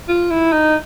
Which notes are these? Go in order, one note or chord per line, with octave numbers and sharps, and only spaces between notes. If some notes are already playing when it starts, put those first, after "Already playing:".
F4
E4
D#4